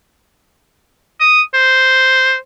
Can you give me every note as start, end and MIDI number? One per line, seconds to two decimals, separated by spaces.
1.20 1.41 87
1.54 2.35 72